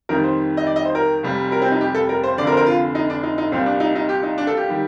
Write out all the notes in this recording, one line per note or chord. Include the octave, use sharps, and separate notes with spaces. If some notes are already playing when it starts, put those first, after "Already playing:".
F2 D#3 G3 A#4
C5
D#5
D5
D#5
C5
A#4
F1 F2 C3 G3
A#4
C4
D#4
G4
A4
A#4
C5
F1 F2 D3 D5
A#4
C5
A#4
F4
D#4
D4
D#4
D#4
C2 A#2 G3 C4
D4
D#4
D#4
G4
D#4
D4
A4
G4
D#3 G3